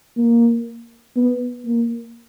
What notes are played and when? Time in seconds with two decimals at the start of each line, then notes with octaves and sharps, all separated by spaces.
0.17 A#3
1.16 B3
1.66 A#3